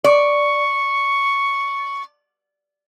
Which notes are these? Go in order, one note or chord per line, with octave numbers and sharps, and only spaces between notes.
D5 C#6